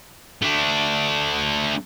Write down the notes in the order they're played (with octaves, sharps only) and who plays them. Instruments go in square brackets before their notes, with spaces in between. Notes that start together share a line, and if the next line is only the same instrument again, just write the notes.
[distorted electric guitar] A3 D4